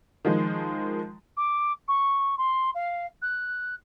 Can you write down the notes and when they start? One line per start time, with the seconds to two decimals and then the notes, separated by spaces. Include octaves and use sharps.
0.25 D#3 F3 G#3
1.37 D6
1.88 C#6
2.38 C6
2.74 F5
3.22 F#6